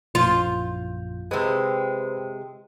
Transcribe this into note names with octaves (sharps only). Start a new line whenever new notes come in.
A#1 F#2 F4 G6
C3 G#3 B4 C5 G5